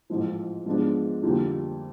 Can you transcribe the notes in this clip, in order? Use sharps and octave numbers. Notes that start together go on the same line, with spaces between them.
A1 G#2 F3
G#2 F3 G#3 B3 D4
F2 D3 G3 A#3